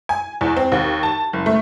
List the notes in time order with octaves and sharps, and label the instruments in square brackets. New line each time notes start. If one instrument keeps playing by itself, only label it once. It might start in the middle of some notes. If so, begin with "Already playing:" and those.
[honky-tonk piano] G#5
E2
C4
D#2
A5
F#1
A3